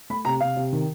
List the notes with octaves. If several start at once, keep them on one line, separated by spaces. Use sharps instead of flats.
A3 B5
C3 A#5
C3 F5
C3
D#3